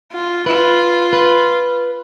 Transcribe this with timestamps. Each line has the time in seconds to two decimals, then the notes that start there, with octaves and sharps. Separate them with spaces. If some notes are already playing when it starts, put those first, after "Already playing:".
0.12 F4
0.46 F4 B4
1.13 B4